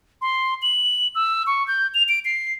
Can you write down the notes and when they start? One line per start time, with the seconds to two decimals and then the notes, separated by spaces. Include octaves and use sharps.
0.22 C6
0.62 F#7
1.15 E6
1.47 C#6
1.68 G6
1.94 F7
2.09 D7
2.25 C7